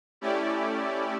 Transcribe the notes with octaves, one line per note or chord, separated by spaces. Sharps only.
A3 C#4 E4 G4 D5